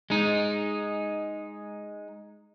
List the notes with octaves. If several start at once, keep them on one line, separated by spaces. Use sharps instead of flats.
G#3 D#4